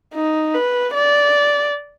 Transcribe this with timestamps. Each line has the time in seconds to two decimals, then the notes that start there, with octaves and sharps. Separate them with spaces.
0.14 D#4
0.54 B4
0.94 D5